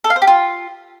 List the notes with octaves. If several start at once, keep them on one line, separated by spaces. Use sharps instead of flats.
A4
F5
C5
G4
F4